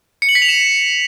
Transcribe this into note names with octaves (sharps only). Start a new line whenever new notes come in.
C#7
F#7
B6
F7
E7